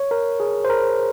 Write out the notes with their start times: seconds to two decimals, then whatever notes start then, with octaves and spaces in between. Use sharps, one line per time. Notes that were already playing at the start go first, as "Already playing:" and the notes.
Already playing: C#5
0.11 A#4
0.40 G#4
0.65 C5
0.70 A#4